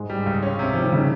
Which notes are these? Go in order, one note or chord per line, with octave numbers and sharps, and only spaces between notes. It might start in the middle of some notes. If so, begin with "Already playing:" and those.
Already playing: G#2 G#3
G3
C#2
C#4
C3
F3 G3
D#3
C#3